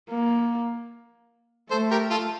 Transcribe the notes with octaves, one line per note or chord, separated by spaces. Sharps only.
A#3
A3 A4 C5
G4 A#4
F4 A4